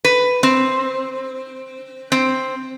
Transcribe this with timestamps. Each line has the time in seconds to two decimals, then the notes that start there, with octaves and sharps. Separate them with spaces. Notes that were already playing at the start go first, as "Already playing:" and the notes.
0.04 B4
0.43 C4
2.12 C4